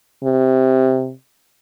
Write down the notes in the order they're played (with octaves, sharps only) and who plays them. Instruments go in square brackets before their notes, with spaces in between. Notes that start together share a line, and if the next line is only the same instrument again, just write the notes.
[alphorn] C3